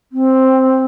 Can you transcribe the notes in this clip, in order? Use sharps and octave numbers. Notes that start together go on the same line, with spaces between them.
C4